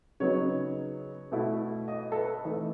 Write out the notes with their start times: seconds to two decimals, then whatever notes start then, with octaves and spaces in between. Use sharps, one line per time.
0.20 C#3 F#3 B3 D#4 C#5
1.32 B2 A3 E4
1.88 D#5
2.12 A4
2.16 B4
2.45 E3 A3 D#4 A4